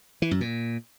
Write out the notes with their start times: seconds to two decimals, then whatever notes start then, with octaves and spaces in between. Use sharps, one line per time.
0.22 E3
0.31 F#2
0.41 A#2